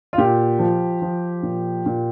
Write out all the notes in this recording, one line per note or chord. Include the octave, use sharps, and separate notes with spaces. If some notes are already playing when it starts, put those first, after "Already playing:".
F4
A#2 G4
F3
F3
A#2
A#2